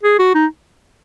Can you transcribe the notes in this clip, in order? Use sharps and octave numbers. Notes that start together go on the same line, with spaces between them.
G#4
F#4
D#4